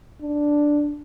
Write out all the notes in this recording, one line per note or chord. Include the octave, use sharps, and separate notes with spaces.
D4